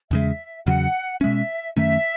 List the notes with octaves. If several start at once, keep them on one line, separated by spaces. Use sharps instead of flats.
E2 C#3 G#3 E5
E2 C#3 F#3 F#5
B2 G#3 C#4 E5
F#2 D#3 A3 C#4 E5